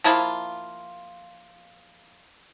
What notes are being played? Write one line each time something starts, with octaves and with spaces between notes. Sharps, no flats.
F3 A#3 E4 F4